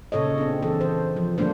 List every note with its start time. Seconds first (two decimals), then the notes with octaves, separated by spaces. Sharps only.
0.12 A#2 C#3 A4 C#5 D#5
0.38 C4 D4
0.62 E3 A4
0.81 C5
1.16 F3
1.38 D3 G3 A3 A#3 D4 C5